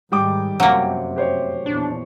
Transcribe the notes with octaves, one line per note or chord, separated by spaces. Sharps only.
G#2 D#3 G3 G5 D6
F1 F#2 C3 F#3 A#3
G4 C5 C#5
A#1 E2 D4